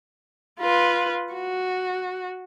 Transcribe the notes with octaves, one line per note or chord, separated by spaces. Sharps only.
F4 B4
F#4